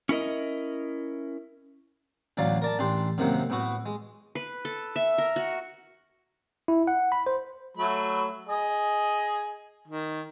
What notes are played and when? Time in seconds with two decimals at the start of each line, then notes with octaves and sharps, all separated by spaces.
0.09 C#4 E4 A#4 D#5
2.37 A1 D2 F#3 D5 F5
2.62 A#4 D5 A5
2.79 A1 D4 G4 C6
3.18 F#2 C3 D#3 A#3 F#5
3.50 A2 B3 F#4
3.86 G#3
4.35 B4
4.65 A4
4.96 E5
5.18 A#4
5.36 F#4
6.68 E4
6.87 F#5
7.12 B5
7.26 C5
7.77 F#3 A3 B5
8.49 G#4 D#5
9.88 D#3